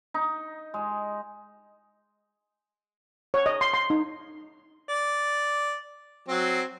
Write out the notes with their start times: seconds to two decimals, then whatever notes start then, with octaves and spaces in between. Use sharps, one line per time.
0.14 D#4
0.74 G#3
3.34 C#5
3.46 D#5
3.61 C6
3.74 C6
3.90 D#4
4.89 D5
6.28 F#3 C4